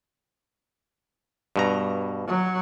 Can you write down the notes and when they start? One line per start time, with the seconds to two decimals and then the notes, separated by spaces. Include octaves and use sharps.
1.56 G2 B2 A#5
2.28 F#3